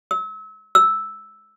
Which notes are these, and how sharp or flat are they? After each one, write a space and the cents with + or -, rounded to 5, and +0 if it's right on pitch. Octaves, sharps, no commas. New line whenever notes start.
E6 -35
E6 -5